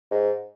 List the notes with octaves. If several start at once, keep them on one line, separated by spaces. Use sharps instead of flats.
G#2